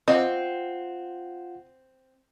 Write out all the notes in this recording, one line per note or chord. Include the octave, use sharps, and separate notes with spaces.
C4 F4 D#5 F#5